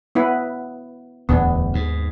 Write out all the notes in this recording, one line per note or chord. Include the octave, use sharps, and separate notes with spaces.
B3 E4 B4
D1 E2 B3 D4
D#2 G#2